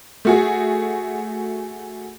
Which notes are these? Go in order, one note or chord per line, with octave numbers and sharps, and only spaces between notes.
A3 F#4 G#4